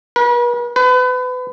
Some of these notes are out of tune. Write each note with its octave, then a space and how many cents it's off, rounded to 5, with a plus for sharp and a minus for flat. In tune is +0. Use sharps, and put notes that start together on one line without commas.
B4 -45
B4 +30